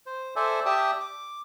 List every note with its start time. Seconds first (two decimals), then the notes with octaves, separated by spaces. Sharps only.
0.06 C5
0.36 A4 C5 D5 E5 G#5
0.66 G4 D5 E5 G5 A5 D#6
1.00 D6